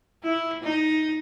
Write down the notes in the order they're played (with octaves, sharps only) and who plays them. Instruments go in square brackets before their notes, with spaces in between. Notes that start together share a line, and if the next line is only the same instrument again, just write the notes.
[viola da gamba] E4
D#4